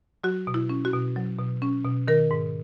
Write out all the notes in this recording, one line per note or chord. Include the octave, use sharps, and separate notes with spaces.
F#3 F#4
B2
E4
C#4
F#4
B2
F#3
B2
C#4
B2
D#3 A#4
G#2